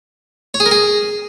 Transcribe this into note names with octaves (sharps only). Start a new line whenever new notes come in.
C#5
G#4
A#4
G#4